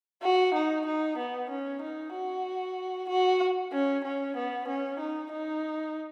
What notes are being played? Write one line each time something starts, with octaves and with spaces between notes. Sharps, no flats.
F#4
D#4
D#4
B3
C#4
D#4
F#4
F#4
C#4
C#4
B3
C#4
D#4
D#4